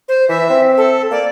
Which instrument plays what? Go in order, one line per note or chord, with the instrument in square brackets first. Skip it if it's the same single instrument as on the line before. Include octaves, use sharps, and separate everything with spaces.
[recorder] C5
[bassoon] E3 [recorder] E5
[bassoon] C4
[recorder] A4
[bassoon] A#3 [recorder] D5